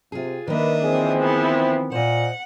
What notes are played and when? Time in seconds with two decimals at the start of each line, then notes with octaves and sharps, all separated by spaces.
0.12 C3 F4 G#4
0.48 D#3 A#3 D4 B4 D#5 E5
0.83 E3 F3 C4 G#4
1.19 B3 E4
1.92 A#2 C5 D#5 F#5